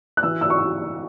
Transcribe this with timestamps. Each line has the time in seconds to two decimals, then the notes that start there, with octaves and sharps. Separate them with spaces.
0.17 F#6
0.23 E3 E6
0.41 E6
0.50 C#6